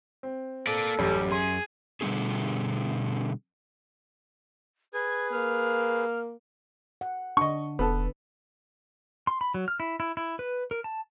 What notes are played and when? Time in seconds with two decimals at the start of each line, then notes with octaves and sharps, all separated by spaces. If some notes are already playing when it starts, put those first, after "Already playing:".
0.23 C4
0.67 A#3 A4 D5
0.99 A1 F#2 G3
1.32 G#4 C6
2.01 B2 D3 G3 C#4 G#4
4.94 G#4 B4 G#6
5.32 A#3 F6
7.01 F#5
7.37 D3 D4 D#5 C#6
7.79 E1 B3 A4 B4
9.27 C6
9.41 B5
9.54 F#3
9.68 F6
9.80 E4
10.00 E4
10.17 E4
10.39 B4
10.71 A#4
10.84 A5